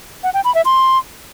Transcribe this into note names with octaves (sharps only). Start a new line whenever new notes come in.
F#5
G5
B5
E5
C6